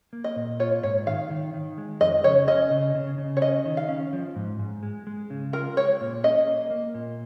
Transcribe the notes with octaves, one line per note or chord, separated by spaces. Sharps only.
A#3
D#5
A#2
F4 C#5
G#2 C#5
D#3 F5
D#3
D#3
G#3
F2 D#5
C#3 C#5
C#4 D#5
C#3
C#3
C#3
C#5
C#4 D#5
D#3
F5
C#4
F3
G#2
G#2
G#3
G#3
C#3
F4 A#4
G#3 C#5
A#2
C#4 D#5
A#3
A#3
A#2